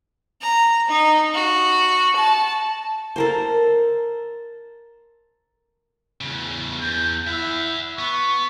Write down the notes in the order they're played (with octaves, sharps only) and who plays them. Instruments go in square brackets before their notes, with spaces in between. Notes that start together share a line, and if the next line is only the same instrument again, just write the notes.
[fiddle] A#5
D#4
F#4
A5
[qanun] A4 A#4 C5
[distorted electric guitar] E2 C#3
[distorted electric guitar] E2 [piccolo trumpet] G6
[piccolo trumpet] E4 [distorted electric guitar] E5 F#5
[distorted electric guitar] B3 [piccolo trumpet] C#6